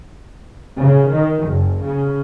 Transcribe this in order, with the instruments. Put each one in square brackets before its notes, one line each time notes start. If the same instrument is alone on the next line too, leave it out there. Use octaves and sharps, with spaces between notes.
[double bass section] C#3
D#3
F#1
C#3